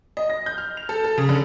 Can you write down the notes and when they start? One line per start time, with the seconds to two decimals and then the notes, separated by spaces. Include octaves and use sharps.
0.17 D#5
0.30 A#6
0.46 G6
0.58 F6
0.77 F7
0.89 A4
1.04 A4
1.18 C#3
1.29 D3